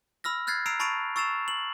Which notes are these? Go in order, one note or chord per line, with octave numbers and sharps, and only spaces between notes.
B5 E6 F6 A#6
F6 F#6 G#6 A6 C7
A#5 E6 C7 D7 F7
A5 B5 C#6 A6 D7 F7
C#6 E6 A6 C7 E7 F7
F#7